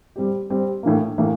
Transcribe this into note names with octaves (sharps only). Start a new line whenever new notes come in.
G3 C4 G4
G3 C4 G4
A2 E3 A#3
A2 E3 A#3